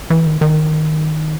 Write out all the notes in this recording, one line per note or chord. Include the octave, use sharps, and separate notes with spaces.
E3
D#3
D#3